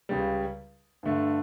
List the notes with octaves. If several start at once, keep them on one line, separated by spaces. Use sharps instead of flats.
C#2 C#3 G3
G2 D3 A3